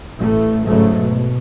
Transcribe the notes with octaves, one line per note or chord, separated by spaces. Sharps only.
A1 A2 A3
G#2 C#3 F#3 A3
B2